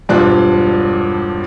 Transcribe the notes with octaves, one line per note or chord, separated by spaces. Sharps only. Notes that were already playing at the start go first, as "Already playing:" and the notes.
E1 G2 F3 D4 F4 F#6